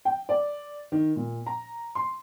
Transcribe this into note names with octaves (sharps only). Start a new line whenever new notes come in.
G5
D5
D#3
A#2
A#5
C6